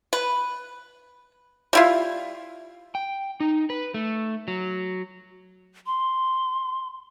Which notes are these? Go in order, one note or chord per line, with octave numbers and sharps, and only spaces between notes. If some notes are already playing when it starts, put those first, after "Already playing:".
B4
G3 E4 F4
G5
D#4
B4
A3
F#3
C6